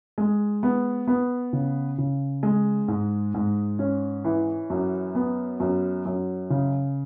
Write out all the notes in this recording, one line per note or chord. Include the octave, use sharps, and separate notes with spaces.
G#3
B3
B3
C#3
C#3
G#3
G#2
G#2
C#4
E3
F#2
B3
F#2
F#2
C#3